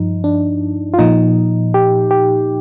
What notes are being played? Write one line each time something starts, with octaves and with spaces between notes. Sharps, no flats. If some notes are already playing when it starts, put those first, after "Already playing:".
Already playing: G2 F3 D#4
D4
F4
A#2 F3 D#4
G4
G4